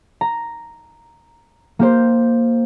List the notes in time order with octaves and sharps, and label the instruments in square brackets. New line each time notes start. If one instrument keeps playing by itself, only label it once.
[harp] A#5
A#3 G4 C5